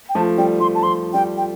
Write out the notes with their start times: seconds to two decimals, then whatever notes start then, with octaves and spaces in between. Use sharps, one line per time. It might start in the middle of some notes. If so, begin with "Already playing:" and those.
0.09 G5
0.15 F3 A3 A5
0.38 G3 G5
0.60 G3 C6
0.75 A5
0.83 F3 C6
1.13 G3 G5
1.37 G5